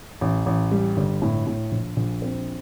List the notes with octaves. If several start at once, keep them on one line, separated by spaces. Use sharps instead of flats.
A1
A1
G3
G1
A2
A2
A#1
A#1
C4